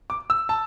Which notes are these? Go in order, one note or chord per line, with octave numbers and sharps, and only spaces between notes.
D6
E6
A5